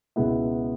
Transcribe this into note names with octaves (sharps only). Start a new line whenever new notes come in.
C#2 B2 G#3 B3 E4